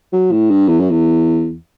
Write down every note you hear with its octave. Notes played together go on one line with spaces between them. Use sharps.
F#3
A2
G2
E2
F#2
E2